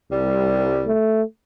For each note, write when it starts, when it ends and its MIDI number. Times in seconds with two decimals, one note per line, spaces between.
0.11 0.94 36
0.11 0.91 55
0.87 1.22 57